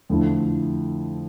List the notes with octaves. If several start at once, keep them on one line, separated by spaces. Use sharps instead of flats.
F2 D3 A3 E4